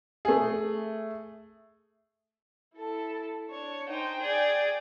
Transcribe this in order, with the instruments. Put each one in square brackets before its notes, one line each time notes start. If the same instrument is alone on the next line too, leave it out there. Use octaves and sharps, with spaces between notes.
[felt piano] A3 G#4
[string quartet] E4 A4 A5
D4 C#5
[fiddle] D#4 C5 [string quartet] G5 G#5
[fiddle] G#4 D5